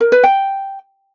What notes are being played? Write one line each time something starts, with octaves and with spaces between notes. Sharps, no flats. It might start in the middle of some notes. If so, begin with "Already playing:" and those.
A#4
B4
G5